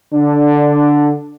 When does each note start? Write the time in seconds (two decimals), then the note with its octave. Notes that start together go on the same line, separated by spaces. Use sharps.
0.14 D3 D4